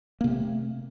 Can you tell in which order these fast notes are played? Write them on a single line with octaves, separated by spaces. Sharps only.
A#3 C3 C4 A3